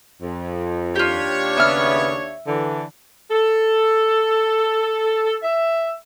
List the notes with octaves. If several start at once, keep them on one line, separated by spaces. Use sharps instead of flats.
F2
D#2 D4 F4 G4 C#5
C#3 B3 E5 F6
D3 E3
A4
E5